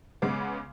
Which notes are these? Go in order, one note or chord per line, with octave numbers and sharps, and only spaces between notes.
C#3 G#3 B3 D6